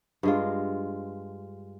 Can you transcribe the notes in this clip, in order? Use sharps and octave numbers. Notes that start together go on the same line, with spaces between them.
G2 G#3 F4